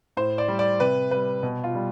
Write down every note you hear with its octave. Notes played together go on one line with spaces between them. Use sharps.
A2 C5
D5
G3
D5
C3 B4
G3 B4
B2
F4
G3